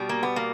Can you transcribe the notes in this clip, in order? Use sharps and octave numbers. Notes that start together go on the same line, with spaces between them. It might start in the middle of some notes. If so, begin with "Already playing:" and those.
Already playing: B2 G3
A#3
B3
A#3